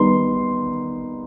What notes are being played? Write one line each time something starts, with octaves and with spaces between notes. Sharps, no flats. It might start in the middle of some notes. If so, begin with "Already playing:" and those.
Already playing: D#3 G3 B3 D#4 C6